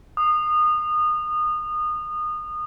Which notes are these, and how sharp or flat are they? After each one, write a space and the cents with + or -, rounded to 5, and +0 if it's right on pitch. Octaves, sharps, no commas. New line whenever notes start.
D#6 -25